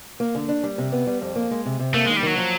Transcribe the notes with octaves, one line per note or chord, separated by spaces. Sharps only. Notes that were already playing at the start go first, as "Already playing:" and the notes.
A#3
D3
D4
G3
C3
B3
G3
F2
A#3
G#3
C3
C3
A3 A#3
D#3 G#3
G3
D#3 F#3
F3